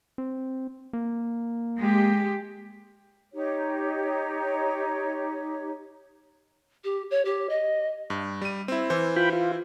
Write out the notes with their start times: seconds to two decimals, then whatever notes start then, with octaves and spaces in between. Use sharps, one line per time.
0.18 C4
0.93 A#3
1.79 G#3 G4
3.34 D#4 G4 C#5
6.84 G4
7.11 C#5
7.25 G4
7.50 D#5
8.10 G2
8.42 G3 D#7
8.68 C4 E4
8.90 E3 C5
9.16 F4 G5 B5
9.33 F4